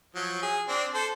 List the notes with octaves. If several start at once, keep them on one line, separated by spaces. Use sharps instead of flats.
F3 F#3
G#4
C4 D4
A4 C5